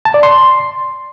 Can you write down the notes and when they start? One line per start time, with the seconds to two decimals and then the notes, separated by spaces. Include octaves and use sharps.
0.05 A5
0.14 D5
0.23 C6